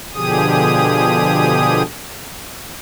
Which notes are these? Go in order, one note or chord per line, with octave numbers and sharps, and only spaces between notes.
B2 D3 F3 G4 G#4 D#6